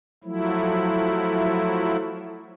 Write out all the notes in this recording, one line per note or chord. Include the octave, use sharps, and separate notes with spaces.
F3 F#3 A3 E4